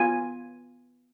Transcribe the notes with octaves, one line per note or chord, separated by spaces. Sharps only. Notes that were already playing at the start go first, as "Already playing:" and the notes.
Already playing: B3 F4 G#5